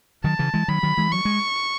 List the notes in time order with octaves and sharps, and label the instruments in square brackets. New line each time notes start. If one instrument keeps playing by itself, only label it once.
[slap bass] D#3 F#3 [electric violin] A5
[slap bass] C#3 E3
E3 G#3
[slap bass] D#3 F#3 [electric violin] B5
[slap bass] D#3 F#3
E3 G#3
[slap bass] F#3 [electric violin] C#6
[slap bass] G#3